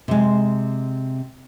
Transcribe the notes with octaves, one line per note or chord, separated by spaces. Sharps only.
C3 G#3